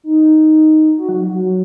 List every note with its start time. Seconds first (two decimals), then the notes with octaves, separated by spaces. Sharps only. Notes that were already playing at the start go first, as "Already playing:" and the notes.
0.04 D#4
0.97 F#4
1.09 F#3
1.21 F#3
1.32 F#3